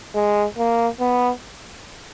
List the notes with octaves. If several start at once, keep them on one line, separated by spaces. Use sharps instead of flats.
G#3
A#3
B3